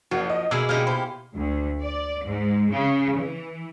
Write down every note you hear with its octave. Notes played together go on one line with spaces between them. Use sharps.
F#1 F3 F#4
D#5
B2 A#3 E4 G#4 D5 E6
G3 G#3 A#3 D#4 E4 F6
G4 C5 B5
D2
D5
G#2
C#3
E3